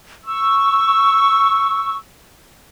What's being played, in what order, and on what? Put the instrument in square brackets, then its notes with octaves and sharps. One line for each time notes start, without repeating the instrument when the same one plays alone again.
[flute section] C#6 E6